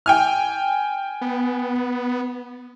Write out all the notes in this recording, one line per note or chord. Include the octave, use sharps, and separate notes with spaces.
G5 G#5 F6
B3